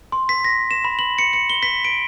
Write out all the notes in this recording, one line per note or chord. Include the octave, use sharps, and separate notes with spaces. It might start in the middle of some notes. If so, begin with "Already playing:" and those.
C6
B6
A#6
E7
B5
F#7
C#7
C#7
G7
B6
D7